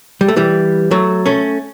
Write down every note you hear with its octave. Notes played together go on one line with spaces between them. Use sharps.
G3
A3
E3 G3
F#3 A3
A3 C#4